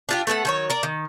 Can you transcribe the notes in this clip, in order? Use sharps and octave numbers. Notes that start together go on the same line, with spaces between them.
D4 F4 G4
A3 B3 A4 F#5
D#3 F#3 C#5
A#4 D5
D#3